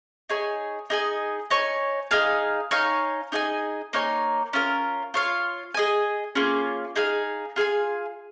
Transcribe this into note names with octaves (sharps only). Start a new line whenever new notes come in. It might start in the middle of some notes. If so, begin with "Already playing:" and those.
D#4 G#4 C#5 G#5
D#4 G#4 D#5 G#5
D#4 C#5 G#5
D#4 G#4 F5 G#5
D#4 C#5 F5 G#5
D#4 G#4 D#5 G#5
A#3 D#4 C#5 G#5
C#4 F4 A#4
F4 C#5 F5
G#4 D#5 G#5
A#3 C#4 F4 G#4
D#4 G#4 F5 G#5
F4 G#4 F5 G#5